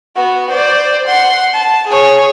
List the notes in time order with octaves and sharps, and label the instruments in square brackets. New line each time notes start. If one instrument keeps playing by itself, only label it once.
[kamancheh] B3 F#4
C5 D5
F#5 C6
A5
G#4 C#5